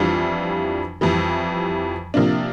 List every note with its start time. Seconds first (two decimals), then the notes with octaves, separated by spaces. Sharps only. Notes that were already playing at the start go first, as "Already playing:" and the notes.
Already playing: F2 E3 G3 D4 F4
1.01 F2 E3 G3
2.14 C3 F3 A#3 D4